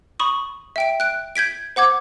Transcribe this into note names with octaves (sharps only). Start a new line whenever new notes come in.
B5 C#6 D#6
E5 G5 D7
F#6 D7
G6 G#6 B6 D7
C5 F#5 D6 G#6